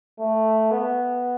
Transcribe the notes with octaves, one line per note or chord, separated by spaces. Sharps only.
A3
B3